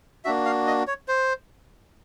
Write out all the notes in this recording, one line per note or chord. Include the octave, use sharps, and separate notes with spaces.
A#3 D4 F#4 E5
F5
D#5
C#5
C5